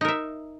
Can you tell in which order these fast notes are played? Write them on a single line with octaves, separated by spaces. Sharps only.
D#4 A#4 E5